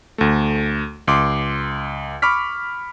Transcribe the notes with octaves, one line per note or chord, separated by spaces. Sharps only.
D2 A3
C#2 C6 D6
B5 C#6 D6 F6 B6